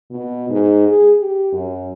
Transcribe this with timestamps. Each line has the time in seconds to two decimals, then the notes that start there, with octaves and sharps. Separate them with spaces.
0.11 B2
0.50 G#2
0.88 G#4
1.19 G4
1.53 F#2